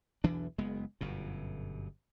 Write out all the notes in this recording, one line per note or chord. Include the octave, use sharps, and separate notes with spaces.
B1 E2 E3 D4
F#1 G#3 B3
G1 F#2 B2